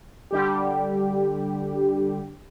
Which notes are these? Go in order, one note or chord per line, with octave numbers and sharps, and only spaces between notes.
D3 G3 G4